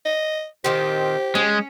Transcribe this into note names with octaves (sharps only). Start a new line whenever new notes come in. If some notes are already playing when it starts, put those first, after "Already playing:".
D#5
A#2 D#3 C4 G4 C5
G#3 C#4